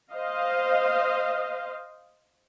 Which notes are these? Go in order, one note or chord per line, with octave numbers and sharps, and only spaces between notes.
C5 D#5 F5